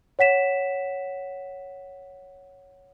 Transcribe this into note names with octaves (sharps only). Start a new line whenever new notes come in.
C#5 F#5 B6 E7